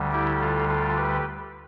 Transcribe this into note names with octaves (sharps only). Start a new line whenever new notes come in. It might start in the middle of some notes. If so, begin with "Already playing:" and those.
Already playing: D2 D3 G3
E4 G4
F4 A4
F4 A4
G4 B4